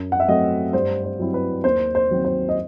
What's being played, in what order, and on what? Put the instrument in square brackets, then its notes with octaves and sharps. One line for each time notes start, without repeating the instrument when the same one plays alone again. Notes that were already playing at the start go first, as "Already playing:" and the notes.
Already playing: [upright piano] F#2
F#5
E5
F#3 A3 C4 D#5
G2 C5
C5
F#3 C4 E4
B4
D#2 C5
C5
D#3 F#3 C4
C5
D#5